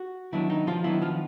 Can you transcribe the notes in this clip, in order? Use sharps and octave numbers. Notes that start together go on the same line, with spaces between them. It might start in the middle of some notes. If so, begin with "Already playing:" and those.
Already playing: F#4
D#3 F#3 B3 D4 E4
D#4
F3 F4
D#3 F#3 B3 D4 E4
F3 F4